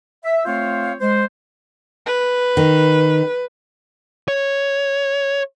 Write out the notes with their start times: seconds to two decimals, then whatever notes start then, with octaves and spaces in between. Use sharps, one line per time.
0.24 E5
0.46 A3 C4 F4 C5 C#5 F5
1.00 G#3 C5
2.06 B4
2.57 D#3
4.28 C#5